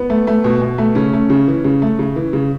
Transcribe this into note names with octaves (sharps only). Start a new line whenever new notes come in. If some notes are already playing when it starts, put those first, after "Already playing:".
Already playing: B3
A3
A3
B2
B2
A3
C#3 C#4
A3
C#3
E3
C#3
A3
C#3
E3
C#3